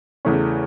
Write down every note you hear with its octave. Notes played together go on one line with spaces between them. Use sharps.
E2 C#3 E3 A3 C#4